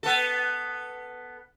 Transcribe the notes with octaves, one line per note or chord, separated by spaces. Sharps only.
B3 A4